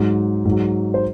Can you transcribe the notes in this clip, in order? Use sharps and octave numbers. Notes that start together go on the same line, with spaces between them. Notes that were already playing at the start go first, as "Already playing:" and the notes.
Already playing: G#2 F#3
G#2 F#3
C5